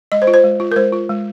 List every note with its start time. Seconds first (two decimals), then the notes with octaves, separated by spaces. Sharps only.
0.12 G#3 D#5
0.22 C5
0.27 F4
0.34 C5
0.44 G#3
0.60 F4
0.72 A#4
0.76 G#3 C5
0.92 F4
1.09 G#3